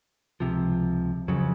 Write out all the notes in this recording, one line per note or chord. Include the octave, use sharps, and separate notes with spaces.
C#2 C3 F3
F1 F2 C#3 F#3